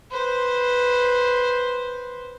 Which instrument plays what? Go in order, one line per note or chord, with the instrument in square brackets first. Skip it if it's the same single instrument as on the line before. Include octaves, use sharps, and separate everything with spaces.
[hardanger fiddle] B4 C5